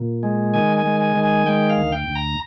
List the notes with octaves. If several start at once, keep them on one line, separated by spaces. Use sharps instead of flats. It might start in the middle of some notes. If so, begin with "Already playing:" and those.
Already playing: A#2
G#3
D#3 G#5
G#5
G#3
G#5
D#3
G#5
G#3 G5
F5
D2
G5
D2
A#5